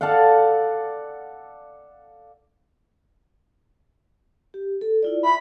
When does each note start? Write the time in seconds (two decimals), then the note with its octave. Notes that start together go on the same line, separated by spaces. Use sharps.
0.01 A4 D5 F5 F#5
4.54 G4
4.81 A4
5.03 E4 F4 D5
5.23 E5 B5